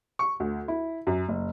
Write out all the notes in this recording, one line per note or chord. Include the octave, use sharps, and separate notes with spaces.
C#6
D2
E4
F#2
F#1